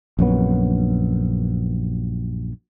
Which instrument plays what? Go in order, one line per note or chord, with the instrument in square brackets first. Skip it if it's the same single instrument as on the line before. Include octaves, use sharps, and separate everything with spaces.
[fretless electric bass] A#1 F#2 F#3 B3